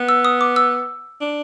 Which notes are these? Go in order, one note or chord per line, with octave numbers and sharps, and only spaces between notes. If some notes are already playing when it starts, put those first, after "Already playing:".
Already playing: B3
E6
D#6
D6
E6
D4